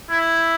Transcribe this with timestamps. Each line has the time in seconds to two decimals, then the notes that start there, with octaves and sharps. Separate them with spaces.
0.10 E4